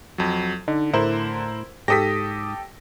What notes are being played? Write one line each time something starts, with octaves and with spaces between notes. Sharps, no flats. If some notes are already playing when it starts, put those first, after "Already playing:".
F2 F#3
D3 D#4
A2 E4 A#4 C5
G#2 G4 A4 D#6 A#6 B6